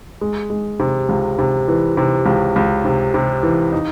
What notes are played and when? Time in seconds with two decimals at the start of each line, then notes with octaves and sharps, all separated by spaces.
0.21 G#3
0.50 G#3
0.80 C3
1.09 C#2
1.39 C3
1.68 E3
1.97 C3
2.26 C#2
2.56 C#2
2.85 C3
3.14 C3
3.43 E3
3.72 D#4